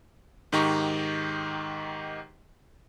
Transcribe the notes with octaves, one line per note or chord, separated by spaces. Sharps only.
G#2 D#3 D#4 G4 A#5 C#6